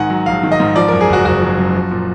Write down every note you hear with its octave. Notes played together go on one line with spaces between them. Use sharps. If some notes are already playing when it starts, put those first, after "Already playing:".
Already playing: G#2 D#3 F#5 G#5
F#3
A#1 F5
D#3
D#5
G#2
F3 D5
F#2 A#4
G#4
F#1 F#4
F#1 F#4
F3
F#2
F3
A#2